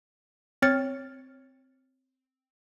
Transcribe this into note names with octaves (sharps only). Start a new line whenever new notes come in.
C4 C#5 F6 A6 C#7